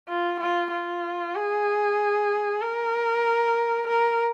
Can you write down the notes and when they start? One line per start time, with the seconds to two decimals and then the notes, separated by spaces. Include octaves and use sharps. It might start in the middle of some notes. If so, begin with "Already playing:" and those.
0.09 F4
0.40 F4
0.71 F4
1.35 G#4
2.62 A#4
3.87 A#4